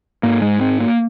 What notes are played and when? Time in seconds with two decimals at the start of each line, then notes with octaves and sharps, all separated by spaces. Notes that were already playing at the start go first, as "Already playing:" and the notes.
0.23 G#2 A#3
0.42 G#3
0.61 C4
0.80 A#3